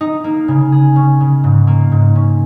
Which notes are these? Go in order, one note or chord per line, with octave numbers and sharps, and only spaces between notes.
D#4
A#3
C#3
G#4
C#4
C#3
G#2
A#3
G#2
C#4